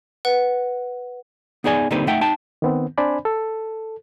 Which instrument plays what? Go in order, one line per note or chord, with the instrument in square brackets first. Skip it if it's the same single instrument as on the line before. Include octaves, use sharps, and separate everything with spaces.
[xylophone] B4 F#5
[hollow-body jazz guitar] B3 D#4 G#4 D5 G#5
D3 G3 A#3 C4 D#4 B4
A3 D#4 E5 F#5 G5
D#4 G5 A5
[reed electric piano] D#3 B3 C4
C4 D4 C5 D5 G#5 B5
A4